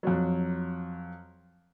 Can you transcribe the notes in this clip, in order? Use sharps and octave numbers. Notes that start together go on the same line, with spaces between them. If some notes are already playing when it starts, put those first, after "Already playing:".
F2 F#3